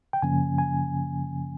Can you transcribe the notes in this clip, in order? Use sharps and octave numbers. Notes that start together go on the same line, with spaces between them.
G5
F#2 C#3 F3 A#3 C#4 G#5
G#5